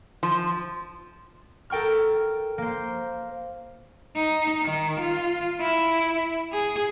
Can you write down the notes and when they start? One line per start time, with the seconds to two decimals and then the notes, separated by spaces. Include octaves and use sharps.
0.23 F3
1.70 A4 A#4 G5 C#6 F6
2.58 A#3 C5
4.16 D#4
4.63 D#3
5.00 F4
5.61 E4
6.52 G#4